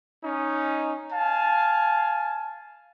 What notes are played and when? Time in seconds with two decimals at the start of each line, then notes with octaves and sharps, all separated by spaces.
0.24 C#4 D#4
1.13 F5 G#5 A5